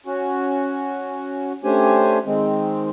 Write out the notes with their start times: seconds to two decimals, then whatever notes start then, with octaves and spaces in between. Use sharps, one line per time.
0.06 C#4 F#4
1.64 A3 C#4 D4 G4 C5 G#5
2.26 D#3 G#3 C4